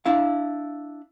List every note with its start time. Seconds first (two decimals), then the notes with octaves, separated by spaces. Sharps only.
0.06 D4 E4 F5